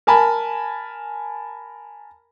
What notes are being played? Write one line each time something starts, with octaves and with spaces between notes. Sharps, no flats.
A#4 G#5 A5 B5